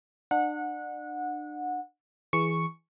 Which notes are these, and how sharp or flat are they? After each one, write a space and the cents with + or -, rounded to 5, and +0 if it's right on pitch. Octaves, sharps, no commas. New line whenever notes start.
D4 +35 F#5 -20
E3 +0 G#4 +0 C#6 +0